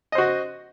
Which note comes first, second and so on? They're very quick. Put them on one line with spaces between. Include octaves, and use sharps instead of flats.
D#5 C5 F#4